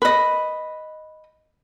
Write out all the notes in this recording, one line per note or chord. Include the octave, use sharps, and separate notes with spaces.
B4 D#5